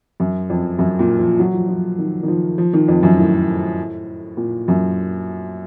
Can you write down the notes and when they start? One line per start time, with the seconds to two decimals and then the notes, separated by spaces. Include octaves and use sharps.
0.20 F#2
0.50 F2
0.79 F#2
0.99 A#2
1.19 F3
1.39 F#3
1.53 F3
1.68 F3
1.99 D#3
2.23 D#3
2.28 F3
2.58 F3
2.73 D#3
2.88 F2
3.03 F#2
3.18 A2
4.37 A#2
4.68 F#2